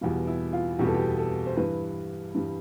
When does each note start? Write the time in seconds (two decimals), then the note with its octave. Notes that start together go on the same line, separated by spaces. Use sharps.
0.01 E2 B2 G3 F4
0.27 E4
0.53 F4
0.79 E2 B2 G3 G4
0.87 A4
0.94 G4
1.18 A4
1.46 C5
1.57 G2 E3 G3 B4
2.35 G2 E3 G3